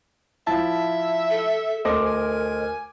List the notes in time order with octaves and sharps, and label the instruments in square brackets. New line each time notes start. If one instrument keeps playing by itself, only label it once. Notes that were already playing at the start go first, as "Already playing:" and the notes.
[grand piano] F3 E4 [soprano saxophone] E5 [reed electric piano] A5
[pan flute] A4
[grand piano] D2 D6 A#6 [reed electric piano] A4 C5 D#5 [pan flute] A#4
[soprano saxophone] G#5